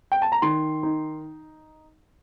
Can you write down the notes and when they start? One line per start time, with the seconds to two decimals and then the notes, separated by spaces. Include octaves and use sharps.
0.12 G5
0.22 A5
0.32 A#5
0.42 D#3 C6
0.83 D#4